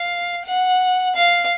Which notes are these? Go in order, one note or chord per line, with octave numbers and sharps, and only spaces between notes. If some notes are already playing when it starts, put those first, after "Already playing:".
Already playing: F5
F#5
F5